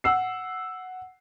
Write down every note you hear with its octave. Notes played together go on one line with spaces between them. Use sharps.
F#5 E6 C7